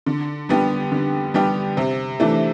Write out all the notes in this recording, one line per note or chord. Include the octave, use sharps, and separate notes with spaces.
D3
G3 B3 D4 G4
D3
G3 B3 D4 G4
C3
E3 A3 D4